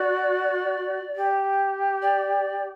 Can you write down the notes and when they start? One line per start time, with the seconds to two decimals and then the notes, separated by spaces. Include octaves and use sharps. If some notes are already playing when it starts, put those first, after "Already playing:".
Already playing: F#4 D5
1.16 G4
2.02 D5